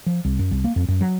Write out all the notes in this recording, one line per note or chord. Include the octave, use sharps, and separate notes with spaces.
F3
C2
F#2
C2
A#3
F2
F#2
F#3